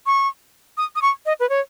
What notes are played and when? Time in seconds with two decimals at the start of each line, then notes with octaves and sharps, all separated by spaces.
0.06 C#6
0.78 D#6
0.96 D#6
1.02 C#6
1.26 D#5
1.40 B4
1.49 C#5